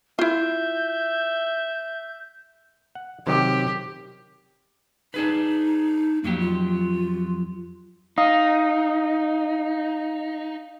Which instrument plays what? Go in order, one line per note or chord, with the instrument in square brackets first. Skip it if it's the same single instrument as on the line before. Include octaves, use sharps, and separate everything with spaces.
[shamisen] E4 F4 [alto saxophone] E5 [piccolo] G6
[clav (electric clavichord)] F#5
[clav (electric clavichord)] C3 D#3 F#3 [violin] G4
[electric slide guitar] D4 G#4 B4 [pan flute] D#4
[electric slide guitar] F2 F#3 G4 [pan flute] A#3
[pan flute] F4
[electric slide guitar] D#4 [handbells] F5 D#6